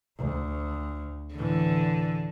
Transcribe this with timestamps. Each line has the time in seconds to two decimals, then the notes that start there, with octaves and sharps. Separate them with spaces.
0.17 D2
1.35 A2 D3 E3